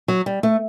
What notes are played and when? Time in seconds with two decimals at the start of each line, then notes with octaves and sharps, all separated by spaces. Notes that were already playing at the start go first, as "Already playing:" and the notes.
0.08 F#3
0.26 G3
0.43 A3